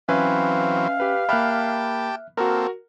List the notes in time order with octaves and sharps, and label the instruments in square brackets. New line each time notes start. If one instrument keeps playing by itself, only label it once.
[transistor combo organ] E3 F#3 C4 [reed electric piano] C#4 E5 G#5 [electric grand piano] B4 [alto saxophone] F5
[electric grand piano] G4 B4
[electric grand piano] A#3 B5 [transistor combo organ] G4 G5 A5 [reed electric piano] E5 F6 F#6
[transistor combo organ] A#3 C4 A4 [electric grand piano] F#4 A#4